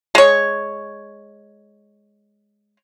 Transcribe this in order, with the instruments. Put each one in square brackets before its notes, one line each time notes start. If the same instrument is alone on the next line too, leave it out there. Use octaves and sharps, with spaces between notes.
[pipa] G#3 C#5